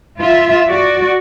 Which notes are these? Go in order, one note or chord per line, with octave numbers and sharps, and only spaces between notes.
F4 E5
F#4 D5